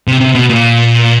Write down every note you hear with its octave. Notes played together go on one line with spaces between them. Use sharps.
C3
C3
B2
A#2